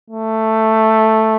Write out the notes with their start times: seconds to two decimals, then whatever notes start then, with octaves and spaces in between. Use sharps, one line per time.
0.11 A3